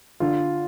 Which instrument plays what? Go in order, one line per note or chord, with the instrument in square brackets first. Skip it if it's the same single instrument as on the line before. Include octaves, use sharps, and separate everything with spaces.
[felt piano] D3 [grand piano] F4